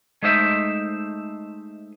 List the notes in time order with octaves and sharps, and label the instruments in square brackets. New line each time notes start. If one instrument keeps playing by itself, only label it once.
[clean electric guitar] G#3 A3 D#4 C5 E5